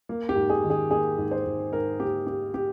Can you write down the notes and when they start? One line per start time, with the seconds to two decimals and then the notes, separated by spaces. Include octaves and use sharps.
0.09 A#3
0.29 G4
0.36 G#2
0.50 G#4
0.64 D#3
0.70 G#4
0.91 A#3 G#4
1.18 G#2
1.31 C5
1.46 G#2
1.72 G#2 A#4
1.99 A#3 G4
2.27 A#3 G4
2.54 A#3 G4